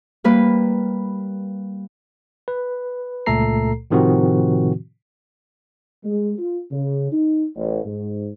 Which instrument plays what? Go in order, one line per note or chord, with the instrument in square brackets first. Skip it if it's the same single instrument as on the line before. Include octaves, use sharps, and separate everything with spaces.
[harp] G3 A#3 B4
[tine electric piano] B4
C#2 A#2 A3 A4 A#5 C7
A2 C3 D#3 F3 C4 F#4
[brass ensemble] G#3
F4
C#3
D#4
A1
G#2